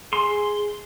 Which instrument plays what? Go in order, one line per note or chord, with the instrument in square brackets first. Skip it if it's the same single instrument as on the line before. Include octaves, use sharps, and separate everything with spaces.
[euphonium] G#4 [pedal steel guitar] C6